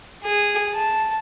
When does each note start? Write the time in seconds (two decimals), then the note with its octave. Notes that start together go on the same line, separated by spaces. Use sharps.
0.24 G#4
0.73 A5